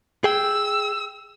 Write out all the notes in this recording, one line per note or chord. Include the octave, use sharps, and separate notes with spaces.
G#4 G5 E6